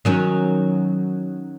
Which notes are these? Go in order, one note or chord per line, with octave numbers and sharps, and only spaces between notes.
D#3 F#3 C#4